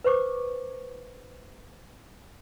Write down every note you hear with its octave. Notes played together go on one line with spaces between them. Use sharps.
B4 C5 C#6 D6